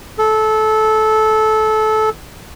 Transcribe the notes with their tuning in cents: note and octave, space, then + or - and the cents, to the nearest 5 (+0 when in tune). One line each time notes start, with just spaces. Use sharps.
A4 -20